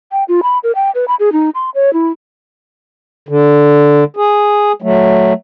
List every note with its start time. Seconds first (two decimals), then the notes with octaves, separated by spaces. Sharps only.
0.12 G5
0.28 F4
0.43 B5
0.63 A#4
0.75 G5
0.95 B4
1.08 B5
1.20 G#4
1.32 D#4
1.55 C6
1.75 C#5
1.93 E4
3.29 D3
4.17 G#4
4.82 F#3 A3